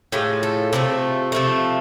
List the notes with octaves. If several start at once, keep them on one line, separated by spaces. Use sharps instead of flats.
A2 F3 G#3 G4
A4
C3 F3 A3
C3 F3 A3